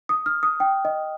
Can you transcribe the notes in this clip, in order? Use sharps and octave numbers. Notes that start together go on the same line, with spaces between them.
D#6
F6
D#6
G5
D#5